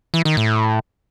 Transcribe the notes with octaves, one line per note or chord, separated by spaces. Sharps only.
E3
D#3
A2